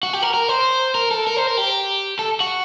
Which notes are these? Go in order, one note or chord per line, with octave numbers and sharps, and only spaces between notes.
F#4
G4
A#4
A#4
C5
A#4
A4
A#4
C5
A#4
G4
A4
F#4